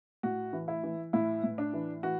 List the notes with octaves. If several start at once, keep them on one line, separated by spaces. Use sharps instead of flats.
A2 F#4
E3
E4
E3
A2 E4
A2
D4
E3
E3 F#4